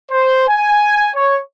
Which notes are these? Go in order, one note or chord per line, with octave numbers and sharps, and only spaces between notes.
C5
G#5
C#5